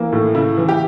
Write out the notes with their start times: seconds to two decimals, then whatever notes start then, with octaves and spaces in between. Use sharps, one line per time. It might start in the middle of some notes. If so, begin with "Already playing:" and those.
Already playing: E3 A#3
0.12 A2
0.35 C#3 E4
0.58 E3
0.69 G4